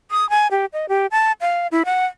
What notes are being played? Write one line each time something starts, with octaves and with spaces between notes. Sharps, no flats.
D#6
G#5
G4
D#5
G4
A5
F5
E4
F#5